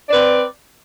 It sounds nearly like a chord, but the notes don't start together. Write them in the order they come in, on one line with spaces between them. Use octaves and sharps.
D5 B4 C4